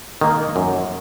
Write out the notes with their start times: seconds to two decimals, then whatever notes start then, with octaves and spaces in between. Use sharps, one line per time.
0.21 D#3 A#3
0.56 F#2